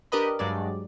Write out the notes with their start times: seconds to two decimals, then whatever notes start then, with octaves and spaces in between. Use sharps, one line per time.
0.12 D4 G4 A#4 B4 D#5 B5
0.39 G2 F#3 G#3 D5